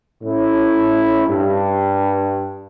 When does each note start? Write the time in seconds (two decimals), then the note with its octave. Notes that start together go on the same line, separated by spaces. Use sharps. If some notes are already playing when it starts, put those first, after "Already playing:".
0.23 A2 C#4 E4
1.28 G2